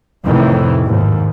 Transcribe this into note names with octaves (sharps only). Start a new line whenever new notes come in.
F2 A2 C3 D#3 E3
D#2 G#2